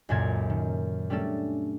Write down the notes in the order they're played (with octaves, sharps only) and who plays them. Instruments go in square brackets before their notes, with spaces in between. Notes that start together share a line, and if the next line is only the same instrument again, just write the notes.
[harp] C#2 F#2 A#2 A4 A#4 G#6
D#3
G3 A3 C#4 D4 A4